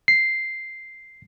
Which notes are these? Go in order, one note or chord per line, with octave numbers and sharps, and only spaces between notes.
C7